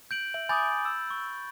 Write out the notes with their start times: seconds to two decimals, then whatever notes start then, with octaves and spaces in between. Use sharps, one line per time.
0.11 G6 D7 F#7
0.34 E5 F#7
0.49 G#5 B5 D6 D#6 G6 A6
0.85 E6
1.10 C#6